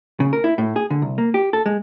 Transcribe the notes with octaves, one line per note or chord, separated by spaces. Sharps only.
C#3
A#4
E4
A2
G#4
D3
C2
A#3
G4
A4
G#3